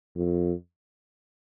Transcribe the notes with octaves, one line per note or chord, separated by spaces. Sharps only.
F2